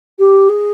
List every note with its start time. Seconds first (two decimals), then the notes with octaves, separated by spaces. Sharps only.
0.19 G4
0.49 G#4